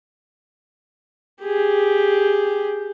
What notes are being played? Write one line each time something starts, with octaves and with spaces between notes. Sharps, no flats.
G4 G#4